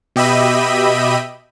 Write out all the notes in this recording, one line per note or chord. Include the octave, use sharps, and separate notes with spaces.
B2 G4 D#5 E5 B5 D#7